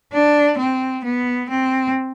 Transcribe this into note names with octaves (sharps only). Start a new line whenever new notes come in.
D4
C4
B3
C4